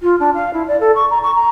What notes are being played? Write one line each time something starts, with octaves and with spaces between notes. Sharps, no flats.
F4
D4
F5
E4
D5
A4
C#6
A#5
C#6
A#5